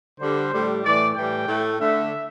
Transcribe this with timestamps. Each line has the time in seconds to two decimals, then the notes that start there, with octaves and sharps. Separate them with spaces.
0.20 D3 G3 C5
0.52 A2 G3
0.84 A2 E3 A3 D5
1.15 A2 E3 G3 G5
1.48 A2 A3
1.80 D3 A3 E5